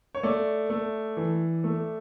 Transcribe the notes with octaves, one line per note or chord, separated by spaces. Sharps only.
C#5
A3 D5
A3
E3
A3